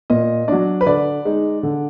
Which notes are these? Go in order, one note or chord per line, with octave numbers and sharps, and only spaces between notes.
A#2 D#5
F#3 D4 D5
B4
D3 D5
G#3 D#4
D3